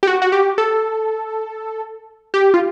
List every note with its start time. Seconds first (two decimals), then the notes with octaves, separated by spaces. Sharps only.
0.03 G4
0.07 F#4
0.22 F#4
0.32 G4
0.58 A4
2.34 G4
2.54 F4